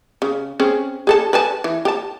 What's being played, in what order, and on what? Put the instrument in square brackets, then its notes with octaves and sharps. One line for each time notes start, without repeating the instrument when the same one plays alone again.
[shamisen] C#3
C4 C#4 G#4
G#4 A4 A5
B4 G#5 A5
E3
G4 A5